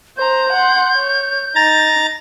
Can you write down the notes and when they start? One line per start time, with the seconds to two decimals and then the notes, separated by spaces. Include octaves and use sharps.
0.17 C5 A#5 G6
0.53 F#5 C6
0.95 C#5
1.55 D#4 A#5 A6